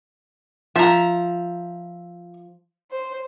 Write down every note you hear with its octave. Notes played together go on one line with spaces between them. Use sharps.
F3 E5 A#5
C5